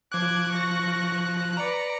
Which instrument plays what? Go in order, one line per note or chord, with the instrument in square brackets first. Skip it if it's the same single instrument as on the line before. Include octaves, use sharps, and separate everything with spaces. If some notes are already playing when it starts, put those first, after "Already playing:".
[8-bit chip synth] F3 F#6 [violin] D6 G#6
[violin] C#6 A#6
[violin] B4 D5 [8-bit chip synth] A#5 C#7